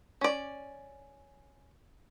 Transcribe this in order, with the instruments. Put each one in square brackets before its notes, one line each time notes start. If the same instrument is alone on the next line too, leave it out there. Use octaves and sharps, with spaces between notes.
[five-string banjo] C#4 D5